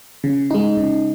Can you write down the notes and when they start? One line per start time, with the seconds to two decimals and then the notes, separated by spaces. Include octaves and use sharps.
0.24 C#3
0.51 G#3 D#4
0.77 C#3